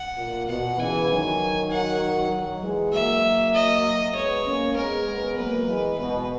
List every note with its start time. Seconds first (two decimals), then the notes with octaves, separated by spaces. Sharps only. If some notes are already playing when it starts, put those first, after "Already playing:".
Already playing: F#5
0.17 A#2
0.48 B2 F#5
0.78 C#3 E3 G#5
1.09 D#3 F#3
1.71 F#5
2.31 D#3 F#3
2.62 E3 G#3
2.92 F#3 A#3 E5
3.54 D#5
4.15 G#3 B3 C#5
4.45 A#3 C#4
4.76 G#3 B3 A#4
5.07 G#3 B3
5.37 F#3 A#3 B4
5.68 E3 G#3
5.98 B2 B4